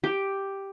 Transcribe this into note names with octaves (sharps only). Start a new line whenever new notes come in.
G4